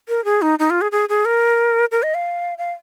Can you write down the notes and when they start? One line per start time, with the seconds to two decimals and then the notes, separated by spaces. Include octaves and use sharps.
0.09 A#4
0.25 G#4
0.42 D#4
0.59 D#4
0.70 F4
0.81 G#4
0.92 G#4
1.09 G#4
1.25 A#4
1.92 A#4
2.03 D#5
2.14 F5
2.58 F5